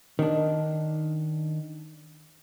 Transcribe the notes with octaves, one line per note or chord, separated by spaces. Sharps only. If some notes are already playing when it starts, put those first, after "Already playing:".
D#3 D4